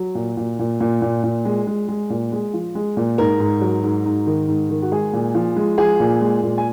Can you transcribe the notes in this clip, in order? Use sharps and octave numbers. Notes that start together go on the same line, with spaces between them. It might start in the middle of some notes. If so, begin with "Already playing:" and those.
Already playing: F#3
A#2
A#2
A#2
A#2
A#2
A#2
G#3
G#3
G#3
A#2
G#3
F3
G#3
A#2
G#2 A#4
G#2
F#3
G#2
G#2
D#3
G#2
D#3
F#4
G#3 G#4
A#2
F3
G#3
F3 G#4
A#2
G#3
A#2
G#5